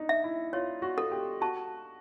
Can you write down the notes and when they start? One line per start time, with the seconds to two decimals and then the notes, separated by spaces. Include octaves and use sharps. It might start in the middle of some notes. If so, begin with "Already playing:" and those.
Already playing: D4 D#4
0.09 E5
0.24 E4
0.53 F4 C#5
0.82 F#4
0.98 A4
1.12 G4
1.41 F#4 A5